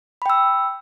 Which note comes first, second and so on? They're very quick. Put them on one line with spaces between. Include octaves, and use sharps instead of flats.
B5 G5 E6